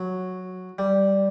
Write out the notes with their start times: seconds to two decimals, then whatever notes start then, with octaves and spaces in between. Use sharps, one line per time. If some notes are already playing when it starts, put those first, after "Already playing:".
Already playing: F#3
0.79 G3